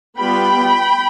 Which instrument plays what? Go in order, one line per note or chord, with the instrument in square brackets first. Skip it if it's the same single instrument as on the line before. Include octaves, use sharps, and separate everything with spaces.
[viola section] G3 B3 F4 G5 B5